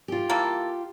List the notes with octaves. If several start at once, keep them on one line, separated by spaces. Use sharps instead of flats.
F4 G4
E3 A#3 A4